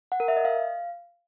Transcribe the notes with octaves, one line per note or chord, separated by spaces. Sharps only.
F#5
A#4
E5
D#5
F5